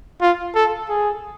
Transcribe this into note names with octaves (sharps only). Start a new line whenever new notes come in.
F4
A4
G#4